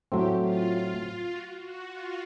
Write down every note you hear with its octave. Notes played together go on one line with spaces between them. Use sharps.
A2 F#3 A3 C4 G4
F4
F#4
F#4
F4